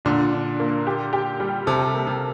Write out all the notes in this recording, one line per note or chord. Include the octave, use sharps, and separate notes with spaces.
A#2 D3 D4
D4
A#3
G4
G4
G3
C3 A4
A#3
C3